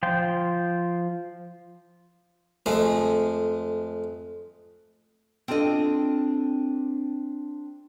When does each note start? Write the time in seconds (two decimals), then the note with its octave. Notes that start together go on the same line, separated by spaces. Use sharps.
0.03 F3 F4 G5
2.66 F2 G#3 A3
5.48 C4 D4 F4 A4 D#5